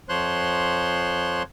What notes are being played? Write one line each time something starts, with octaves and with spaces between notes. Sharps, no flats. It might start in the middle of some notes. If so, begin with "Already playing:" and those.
F2 F3 C5 C#5 C6 F#6